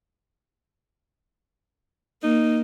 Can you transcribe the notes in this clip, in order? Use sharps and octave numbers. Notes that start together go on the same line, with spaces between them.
A#3 D#4